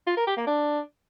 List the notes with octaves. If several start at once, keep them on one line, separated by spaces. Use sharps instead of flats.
F4
A#4
G4
A#3
D4